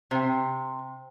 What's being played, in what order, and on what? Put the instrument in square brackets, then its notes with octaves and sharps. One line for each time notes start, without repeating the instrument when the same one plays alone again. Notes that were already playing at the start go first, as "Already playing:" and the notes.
[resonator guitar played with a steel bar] C3 [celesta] C5 G5